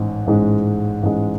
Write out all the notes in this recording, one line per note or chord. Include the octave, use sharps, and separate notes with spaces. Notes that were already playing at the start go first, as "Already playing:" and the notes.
Already playing: A1 G#2 G#3
A1 G#2 G#3
A1 G#2 G#3